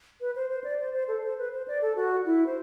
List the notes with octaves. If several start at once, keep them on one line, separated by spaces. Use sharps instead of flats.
B4
C5
C5
D5
C5
C5
A4
C5
B4
C5
D5
A4
F#4
E4
C5